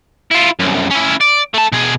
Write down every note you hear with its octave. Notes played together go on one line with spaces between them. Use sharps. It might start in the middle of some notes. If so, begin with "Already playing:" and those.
E4 F4
C2 F#2
C#4 E4
D5
A3 A5
B2 G#4